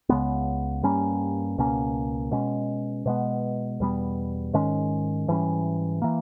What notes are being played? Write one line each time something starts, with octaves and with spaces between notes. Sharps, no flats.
C#2 C#3 G#3 B3
G2 G3 A#3 C#4
C#2 B2 A#3 C#4
B2 G#3 C#4
B2 G#3 B3
E2 B2 G3 B3
G#2 D#3 G#3 C#4
G#2 E3 G3 C#4
E3 A#3